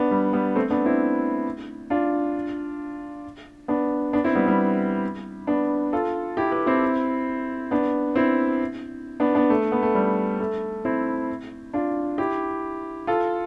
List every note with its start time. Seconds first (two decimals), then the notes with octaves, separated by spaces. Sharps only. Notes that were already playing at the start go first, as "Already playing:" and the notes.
Already playing: B3 D4
0.11 G3
0.33 G3 B3
0.55 A3 C4
0.70 B3 D4
0.86 C4 E4
1.90 D4 F4
3.68 B3 D4
4.13 B3 D4
4.24 C4 E4
4.35 G3 B3
4.47 G3 B3
5.47 B3 D4
5.93 F4 A4
6.37 E4 G4
6.52 G4 B4
6.66 C4 E4
7.71 B3 D4
8.15 C4 E4
9.20 B3 D4
9.35 B3 D4
9.50 A3
9.72 B3
9.83 A3
9.95 G3
10.40 A3
10.85 C4 E4
11.74 D4 F4
12.18 E4 G4
13.07 F4 A4